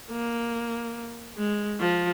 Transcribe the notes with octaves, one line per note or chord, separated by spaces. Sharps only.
A#3
G#3
F3